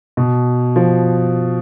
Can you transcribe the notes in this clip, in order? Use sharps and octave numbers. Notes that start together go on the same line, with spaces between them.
B2
F3